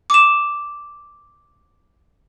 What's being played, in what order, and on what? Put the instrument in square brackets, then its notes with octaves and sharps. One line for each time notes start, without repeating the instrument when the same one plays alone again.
[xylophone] D6 E7